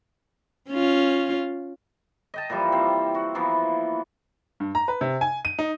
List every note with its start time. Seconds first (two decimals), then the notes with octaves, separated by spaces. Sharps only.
0.70 C#4 F4
2.34 D#5 G5 A5
2.50 A#2 E3 F3 G3
2.72 C4 G4
3.15 F#4
3.35 E3 F3 A#3 B3
4.60 G2
4.75 A#5
4.88 B4
5.01 C3
5.21 G#5
5.45 D#7
5.59 D#4